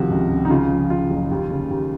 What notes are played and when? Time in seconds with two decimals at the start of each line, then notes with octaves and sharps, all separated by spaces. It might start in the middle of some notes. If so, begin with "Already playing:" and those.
Already playing: C3 D#3 F3 F#4
0.10 C#2
0.30 C#2
0.45 D#4
0.50 C#3 F4
0.70 F3
0.90 C#3 F4
1.10 F#1
1.31 D#2
1.51 C#3
1.70 D#2